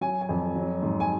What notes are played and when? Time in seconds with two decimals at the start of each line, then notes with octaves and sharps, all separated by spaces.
0.01 F#3 G#5
0.21 G#5
0.29 F2
0.56 F#3
0.82 G#2
1.00 G#5